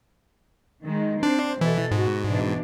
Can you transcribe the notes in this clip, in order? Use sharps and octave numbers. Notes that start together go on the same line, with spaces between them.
D#3 G#3
C4 D4 C5
B2 E3 E4 A4
G#2 F#4
B2 E3 D4